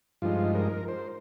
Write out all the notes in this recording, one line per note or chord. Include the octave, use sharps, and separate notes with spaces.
G2 F3 G#3 D#4 F4
A#4
C5